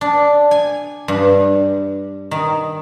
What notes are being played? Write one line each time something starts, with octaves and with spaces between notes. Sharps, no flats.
D4
G#5
G2
D#3